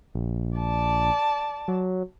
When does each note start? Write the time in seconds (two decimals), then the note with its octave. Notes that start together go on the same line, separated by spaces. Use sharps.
0.14 A#1
0.58 D5 A5
1.68 F#3